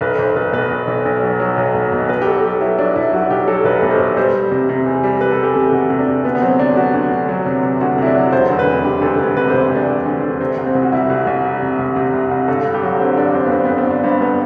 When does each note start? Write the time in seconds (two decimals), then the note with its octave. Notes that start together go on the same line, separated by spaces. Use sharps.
0.01 B1 B4
0.18 B1 C5
0.36 B1 B4
0.53 B2 B4
0.71 B1
0.87 B1
1.05 B1
1.23 F#3
1.40 F#3
1.57 B1
1.74 B2
1.92 B2
2.09 B1 B4
2.22 G4
2.26 F#3 A4
2.44 F#3 G4
2.61 F#3 E4
2.78 F#3 D4
2.96 B1 E4
3.13 F#3 F#4
3.30 B1 G4
3.48 F#3 A4
3.65 B1 B4
3.83 B2
3.91 C5
3.99 B1
4.17 G3 C5
4.35 G3
4.51 C3
4.69 C3
4.86 E2
5.03 G3
5.21 G3 B4
5.32 A4
5.39 E2 G4
5.54 C3 A4
5.72 C3 F#4
5.90 C3
5.99 D4
6.08 C3
6.25 D2 B3
6.35 B3
6.42 F#3 C4
6.59 D2 D4
6.77 F#3 F#4
6.94 D2
7.11 D2
7.29 F#3
7.46 C3
7.63 C3
7.81 D2 F#4
7.98 C3 E4
8.06 D4
8.15 F#3
8.33 E1 C5
8.50 D2
8.59 B4
8.67 C3
8.84 D2 G4
9.02 D2 A4
9.19 E1 B4
9.36 C3 B4
9.50 C3 C5
9.62 B4
9.71 E1 D4
9.89 E1
10.06 D2
10.24 D2
10.41 C3 C4
10.58 C2
10.66 C4
10.75 C2
10.83 F#4
10.92 G3 E4
11.10 C2
11.27 C2
11.44 G3
11.62 C3
11.79 C2
11.96 C3
12.14 C2
12.31 C2
12.48 G1 A4
12.65 G2
12.74 G4
12.83 F#3
13.00 G1 C4
13.17 G1 D4
13.35 G1 C4
13.46 B3
13.52 G1 C4
13.65 G1 B3
13.78 C4
13.86 G1 D4
14.04 G2 C4
14.21 G2 B3